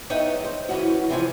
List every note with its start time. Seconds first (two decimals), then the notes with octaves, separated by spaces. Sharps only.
0.10 E2 D#4 B4 C#5 E5 G5
0.44 C5
0.69 E3 C#4 F#4
1.09 C3 E3 F3 G#5